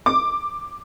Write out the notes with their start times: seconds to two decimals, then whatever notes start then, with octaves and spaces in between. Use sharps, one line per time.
0.06 D6